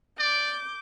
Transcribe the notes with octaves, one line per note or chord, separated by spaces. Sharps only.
D5 D6 G6